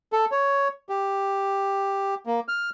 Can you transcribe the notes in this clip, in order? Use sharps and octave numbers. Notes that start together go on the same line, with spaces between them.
A4
C#5
G4
A#3
F6